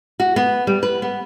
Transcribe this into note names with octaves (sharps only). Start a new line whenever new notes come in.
F#4
B3
G3
B4
B3